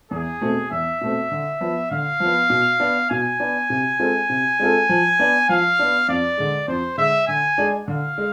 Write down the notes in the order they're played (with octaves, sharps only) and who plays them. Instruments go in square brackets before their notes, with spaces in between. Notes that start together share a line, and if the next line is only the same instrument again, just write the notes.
[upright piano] E2 [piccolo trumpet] G#4
[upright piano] B2 A3 C4
[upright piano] E2 [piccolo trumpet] E5
[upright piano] B2 A3 C4
D3
F3 B3
[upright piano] D3 [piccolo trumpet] F5
[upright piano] F3 B3
B2
B3 D4
[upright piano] B2 [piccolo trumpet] G#5
[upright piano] B3 D4
C3
G#3 C4 F4 A4
C3
G#3 C4 F4 A4
F3
B3 D4
[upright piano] F3 [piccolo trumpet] F5
[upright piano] B3 D4
[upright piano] F2 [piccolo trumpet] D5
[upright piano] D3 G#3
[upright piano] F2 [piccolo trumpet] C5
[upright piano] D3 G#3 [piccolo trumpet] E5
[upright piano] D3 [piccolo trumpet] G#5
[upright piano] G#3 D4
[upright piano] D3 [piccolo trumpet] F5
[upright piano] G#3